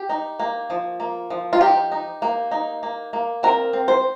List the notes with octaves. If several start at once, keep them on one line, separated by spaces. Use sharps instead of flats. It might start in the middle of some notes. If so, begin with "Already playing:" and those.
Already playing: G4
D#4
A#3
F3
A#3
F3
F4
D#4 G4
D#4
A#3
D#4
A#3
A#3
C4 A#4
C4
C5